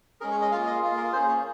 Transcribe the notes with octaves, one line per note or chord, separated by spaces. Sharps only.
G#3 C#4 G#4 A#4
C#5
D#5
A#3 F4 G#4 F5
D#5
A#3 F4 G#4
A#4
A#3 C#4 G#4 C5
C#5